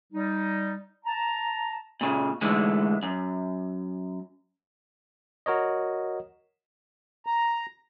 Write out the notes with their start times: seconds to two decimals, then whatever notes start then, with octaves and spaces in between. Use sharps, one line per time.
0.13 G3 D#4
1.05 A5 A#5
2.01 A#2 C#3
2.41 G#2 D3 E3 G#3 A3
3.03 F#2
5.46 F#4 A#4 C#5 D#5
7.26 A#5